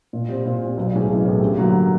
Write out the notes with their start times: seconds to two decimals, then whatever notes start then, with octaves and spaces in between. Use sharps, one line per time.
0.13 A#2
0.29 G3 C4
0.45 A#2
0.61 G3 C4
0.77 B1
0.94 A2 E3 G#3 C#4
1.09 B1
1.25 A2 E3 G#3 C#4
1.42 G2
1.58 D3 F#3 A#3